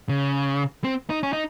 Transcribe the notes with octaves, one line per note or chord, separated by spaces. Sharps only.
C#3
C4
D#4
C#4
D#4